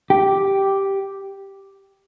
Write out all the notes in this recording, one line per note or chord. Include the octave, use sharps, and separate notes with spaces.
G4